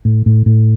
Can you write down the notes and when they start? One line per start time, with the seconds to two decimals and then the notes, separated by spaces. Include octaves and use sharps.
0.05 A2
0.26 A2
0.46 A2